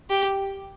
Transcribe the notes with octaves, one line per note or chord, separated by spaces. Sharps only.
G4